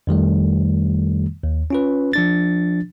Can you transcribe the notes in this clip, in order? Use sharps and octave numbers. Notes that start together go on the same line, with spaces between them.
F2 D#3 G3 A3
D#2
C#4 F4 B4
F3 D4 A6